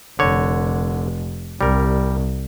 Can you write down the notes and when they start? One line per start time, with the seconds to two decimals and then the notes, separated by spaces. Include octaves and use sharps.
0.19 F1 D3 C#5
1.61 C2 G3 A#4